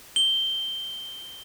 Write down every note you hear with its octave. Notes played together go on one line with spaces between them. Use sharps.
G7